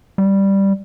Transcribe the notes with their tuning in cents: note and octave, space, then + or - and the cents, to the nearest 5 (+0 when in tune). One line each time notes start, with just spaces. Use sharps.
G3 +0